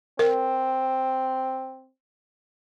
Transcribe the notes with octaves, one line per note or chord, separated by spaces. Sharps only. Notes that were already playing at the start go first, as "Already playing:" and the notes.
C4 A#4